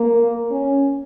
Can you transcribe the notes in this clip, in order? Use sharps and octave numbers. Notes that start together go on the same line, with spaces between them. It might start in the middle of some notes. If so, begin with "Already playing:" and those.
Already playing: A#3
C#4